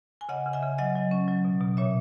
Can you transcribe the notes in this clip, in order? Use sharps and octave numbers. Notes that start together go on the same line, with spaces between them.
G#5
C#3 D#5 F#5
C#3
E5 G#5
C#3
F#3 D#5 F#5
F#3
C#4
F#3
B2
B2
A#2 C#5 E5